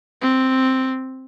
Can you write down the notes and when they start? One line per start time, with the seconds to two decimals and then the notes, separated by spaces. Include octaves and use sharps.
0.22 C4